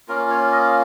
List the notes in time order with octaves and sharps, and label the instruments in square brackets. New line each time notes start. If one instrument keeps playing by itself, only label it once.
[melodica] A#3 C#4 F4 A#4
C#5
D#5